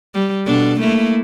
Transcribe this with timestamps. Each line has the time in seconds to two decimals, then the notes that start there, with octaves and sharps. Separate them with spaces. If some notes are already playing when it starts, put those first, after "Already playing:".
0.14 G3
0.46 B2 D4 A4
0.80 A3 A#3 E4